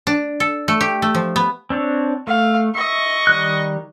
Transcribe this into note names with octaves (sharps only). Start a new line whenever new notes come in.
D4
A4
A3
G4
A3
F3
B3
C4 D4 C#5
A3 F5
D#5 E5 C#6
D#3 G3 F#6